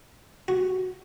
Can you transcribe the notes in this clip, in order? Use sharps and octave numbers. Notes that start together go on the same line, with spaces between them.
F#4